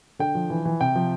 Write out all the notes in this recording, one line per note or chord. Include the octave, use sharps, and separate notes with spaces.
D3 G5
F3
E3
E3
C3 G5
F3